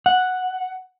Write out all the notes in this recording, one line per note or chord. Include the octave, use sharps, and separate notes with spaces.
F#5